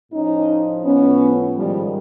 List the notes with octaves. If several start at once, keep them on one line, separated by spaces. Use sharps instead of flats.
A2 F3 C#4 D#4
A2 F3 B3 C#4
G#2 D#3 F3 G3